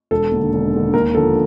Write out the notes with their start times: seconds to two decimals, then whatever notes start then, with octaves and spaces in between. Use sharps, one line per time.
0.11 E1 A4
0.31 D#2
0.36 D3
0.52 E1
0.73 D#2 D3
0.93 D#2 A#4
1.14 D3 F3 A4